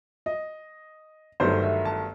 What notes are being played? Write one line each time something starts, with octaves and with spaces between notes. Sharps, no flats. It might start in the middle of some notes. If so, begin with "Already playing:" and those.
D#5
G1 G2 D#3 F#3 A3 C5
E5
A5